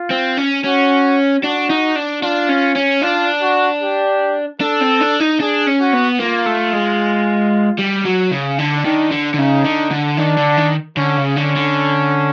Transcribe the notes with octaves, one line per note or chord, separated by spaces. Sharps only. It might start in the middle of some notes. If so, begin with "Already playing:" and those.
Already playing: F4
C4
C#4
C#4 F#4
D4 F#4
D#4
D4
D4 F4
C#4
C#4
D4 F4
F#4
G4
D4 A4
C4
D4
D#4
D4 G#4
C#4
F#4
B3
A#3 F4
A3
G#3
G3
F#3
C#3
D3 D4
D#3
D3
D3
C#3 D#4
D3
D3
D#3 D4
D3
D#3
D3 C#4
C#3
D3 C#4
D3